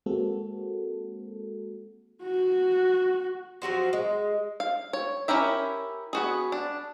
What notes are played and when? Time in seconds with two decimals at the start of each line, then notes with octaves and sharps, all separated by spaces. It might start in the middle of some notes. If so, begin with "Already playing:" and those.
0.06 G#3 A#3 C4 F#4 A4
2.23 F#4
3.62 F3 F#3 F#4 C5
3.93 G#3
4.60 F5
4.93 C#5
5.28 C#4 E4 G4 A#4 E5
6.13 B3 F#4 G#4
6.52 D4